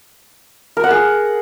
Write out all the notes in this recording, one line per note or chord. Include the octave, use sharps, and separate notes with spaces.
A#4
F#5
G#4